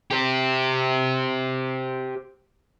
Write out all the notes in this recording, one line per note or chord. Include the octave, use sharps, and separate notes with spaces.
G4 C5